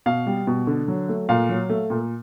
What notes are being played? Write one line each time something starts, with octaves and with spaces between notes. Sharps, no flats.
B2 F5
G3
B2
D3
F#3
A3
A#2 F5
F#3
A3
A#2